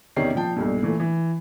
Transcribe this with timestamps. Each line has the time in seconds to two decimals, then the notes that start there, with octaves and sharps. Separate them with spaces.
0.16 E2 C3 D#3 C#4 D5 C7
0.35 A#2 F3 G5 A5
0.56 B1 G2 A#2
0.83 A#2 E3 A3
1.00 E3